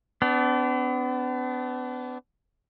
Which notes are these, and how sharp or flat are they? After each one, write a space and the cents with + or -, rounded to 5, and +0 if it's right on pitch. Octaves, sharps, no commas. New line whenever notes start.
B3 +35 D4 -25